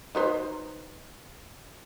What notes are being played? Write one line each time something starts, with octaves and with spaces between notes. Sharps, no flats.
D#4 B4 C5